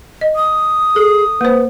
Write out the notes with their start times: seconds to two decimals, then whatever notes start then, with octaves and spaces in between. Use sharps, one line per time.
0.21 D#5
0.36 D#6
0.96 G#4 A4
1.41 A#3 B4 C5